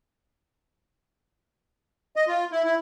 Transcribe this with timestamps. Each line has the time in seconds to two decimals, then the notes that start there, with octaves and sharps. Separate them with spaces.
2.16 D#5
2.28 F4
2.52 E4
2.65 E4